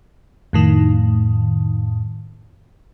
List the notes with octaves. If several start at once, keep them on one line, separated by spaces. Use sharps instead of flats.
F2 A2 D#3